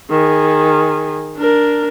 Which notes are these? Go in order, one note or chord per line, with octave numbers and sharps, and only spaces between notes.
D#3 G#4
D4 A#4